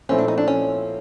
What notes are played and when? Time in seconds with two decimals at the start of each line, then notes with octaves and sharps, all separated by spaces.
0.09 A#2 F3 A3 C4 C#4 E4
0.18 D4
0.28 D#4
0.38 D4
0.48 C#4